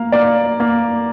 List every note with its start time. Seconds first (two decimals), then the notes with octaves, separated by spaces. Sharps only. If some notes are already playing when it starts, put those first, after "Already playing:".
Already playing: A#3 F5
0.12 A#3 D5
0.60 A#3